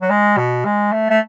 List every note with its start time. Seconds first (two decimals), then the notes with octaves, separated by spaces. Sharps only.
0.02 F#3
0.10 G#3
0.37 B2
0.65 G#3
0.92 A3
1.10 A3